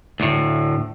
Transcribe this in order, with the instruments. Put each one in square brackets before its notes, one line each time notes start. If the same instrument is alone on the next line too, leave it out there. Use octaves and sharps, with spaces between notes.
[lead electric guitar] D2 A2